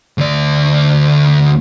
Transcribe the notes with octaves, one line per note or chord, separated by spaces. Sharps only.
D2 D5